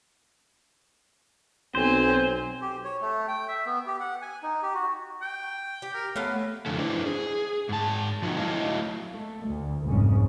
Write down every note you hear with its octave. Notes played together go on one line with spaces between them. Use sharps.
B1 C4 C5 G#5
G4
C#5
A3
G5
E5
B3
G4
F#5
G#5
D#4
G4
F#4
G5
G4
A#4
A3 B3 C#4 F5
F2 D3 A3
D4 E4 B4 C5
G#4
G#2 A5
B2 F3 F#3 D#4 F#4
F#3 A3 E4 D#5 F5 A5
A3
D2
F1 C2 G#2 C#3 C#4